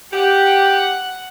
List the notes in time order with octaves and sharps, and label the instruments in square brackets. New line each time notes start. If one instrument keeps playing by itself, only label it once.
[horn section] G4 [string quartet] F#5